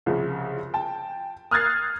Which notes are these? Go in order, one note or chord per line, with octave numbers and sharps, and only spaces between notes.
C2 C#3 F3
G5 A5
D#6 F6 F#6 G#6 A6 C7